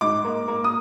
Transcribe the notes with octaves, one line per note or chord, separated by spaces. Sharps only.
G#2 D6
A#3
A#3
D#6